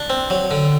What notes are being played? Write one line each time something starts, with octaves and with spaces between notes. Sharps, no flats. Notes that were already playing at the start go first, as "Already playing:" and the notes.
Already playing: D4
C4
F#3
D3